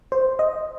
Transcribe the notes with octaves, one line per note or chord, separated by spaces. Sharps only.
C5
D#5